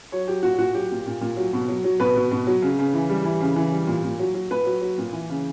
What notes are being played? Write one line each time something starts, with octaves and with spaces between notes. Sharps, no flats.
F#3 C#5
F#3 G4
A#2 F#4
A#2 F#4
F#3 G4
A#2
A#2
A#2
F#3
B2
F#3
F#3
B2 B4
B2
B2
F#3
C#3
C#3
E3
G3
E3
C#3
E3
G3
A#2
A#2
F#3
F#3
A#2 B4
F#3
F#3
A#2
E3
C#3